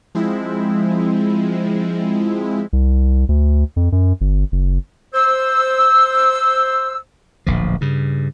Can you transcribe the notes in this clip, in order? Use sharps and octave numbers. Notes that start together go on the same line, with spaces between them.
F3 G#3 C4 E4
C2
D2
F2
F#2
G1
F#1
C5 E6
D1 A#1 F3
G2 C#3